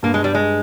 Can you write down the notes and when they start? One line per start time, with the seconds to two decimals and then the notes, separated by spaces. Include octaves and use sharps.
0.03 G2 A#3
0.14 G#3
0.24 G3
0.35 G#3